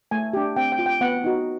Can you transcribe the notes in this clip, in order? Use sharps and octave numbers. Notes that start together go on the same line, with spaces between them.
A3 G#5
D4 G4
C4 G5
G5
F4
G5
B3 F#5
D#4 F#4